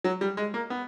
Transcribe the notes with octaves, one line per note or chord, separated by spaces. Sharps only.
F#3
G3
G#3
A#3
B3